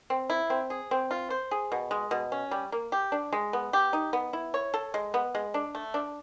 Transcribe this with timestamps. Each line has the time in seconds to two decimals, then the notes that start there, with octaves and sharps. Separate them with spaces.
0.10 C4
0.30 E4
0.50 C4
0.70 G#4
0.91 C4
1.11 F4
1.30 C5
1.51 G#4
1.72 B2
1.91 G#3
2.11 B2
2.32 C#4
2.51 G3
2.72 A#3
2.92 G4
3.12 D4
3.33 G#3
3.53 B3
3.73 G4
3.93 D#4
4.13 B3
4.33 E4
4.54 C#5
4.74 A4
4.94 G#3
5.14 B3
5.35 G#3
5.54 D4
5.75 A3
5.94 D4